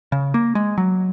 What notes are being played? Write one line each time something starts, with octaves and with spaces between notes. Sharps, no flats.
C#3
A#3
G#3
F#3